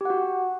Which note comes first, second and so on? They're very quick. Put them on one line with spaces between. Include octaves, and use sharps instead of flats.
G4 F#5 F#4